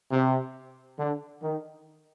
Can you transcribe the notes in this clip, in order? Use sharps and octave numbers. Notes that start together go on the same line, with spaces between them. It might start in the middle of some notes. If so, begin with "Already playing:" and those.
C3
D3
D#3